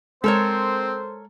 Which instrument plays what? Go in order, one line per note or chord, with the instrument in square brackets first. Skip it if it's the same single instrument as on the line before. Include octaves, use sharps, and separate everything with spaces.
[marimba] G#3 [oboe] C4 [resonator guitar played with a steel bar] A4 A#4 C#5 [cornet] C5